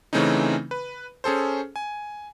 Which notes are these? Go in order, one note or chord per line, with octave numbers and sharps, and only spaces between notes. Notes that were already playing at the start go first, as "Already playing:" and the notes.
C#3 E3 A3 C4 C#4 D#4
B4
C#4 G#4 A4 C5
G#5